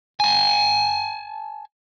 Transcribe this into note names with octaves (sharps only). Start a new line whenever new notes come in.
G#5 A5